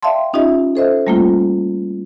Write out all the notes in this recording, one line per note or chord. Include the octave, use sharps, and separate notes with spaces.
D5 E5 F5 G5 A5 C6
C#4 D#4 F4 G4 D#5 E5
A4 C5 D#5 E5
G3 A3 A#3 C#4 F4